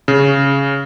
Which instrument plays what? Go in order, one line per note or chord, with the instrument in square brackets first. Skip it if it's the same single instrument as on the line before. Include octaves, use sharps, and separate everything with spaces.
[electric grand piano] C#3